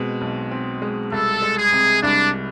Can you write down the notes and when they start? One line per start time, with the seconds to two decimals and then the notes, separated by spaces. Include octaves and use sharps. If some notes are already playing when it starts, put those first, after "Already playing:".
Already playing: B2 G#3 C4
0.21 B1
0.51 C4
0.82 G#3
1.12 C2 A4
1.42 G#3
1.57 G#4
1.72 C3
2.02 C2 D4